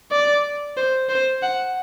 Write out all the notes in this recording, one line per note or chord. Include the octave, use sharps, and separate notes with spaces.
D5
C5
C5
F#5